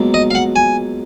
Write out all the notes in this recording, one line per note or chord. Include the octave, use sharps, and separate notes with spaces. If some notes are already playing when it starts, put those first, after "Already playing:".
Already playing: C#2 B2 F#3 A#3
D#5
F5
F#5
G#5